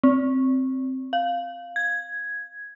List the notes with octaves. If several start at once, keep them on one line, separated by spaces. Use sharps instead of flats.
C4
F5
G#6